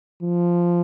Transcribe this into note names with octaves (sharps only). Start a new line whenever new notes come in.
F3